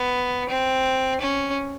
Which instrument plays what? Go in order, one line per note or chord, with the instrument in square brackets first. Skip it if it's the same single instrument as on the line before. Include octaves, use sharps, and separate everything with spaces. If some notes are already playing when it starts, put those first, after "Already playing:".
Already playing: [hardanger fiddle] B3
C4
C#4